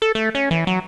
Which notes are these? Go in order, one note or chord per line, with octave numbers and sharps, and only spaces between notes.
A4
A3
C#4
E3
F#3